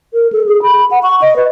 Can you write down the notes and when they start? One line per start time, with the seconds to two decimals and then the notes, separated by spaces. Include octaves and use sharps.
0.13 A#4
0.32 A4
0.46 G#4
0.62 B5
0.91 F#5
1.03 C#6
1.22 D#5
1.36 B4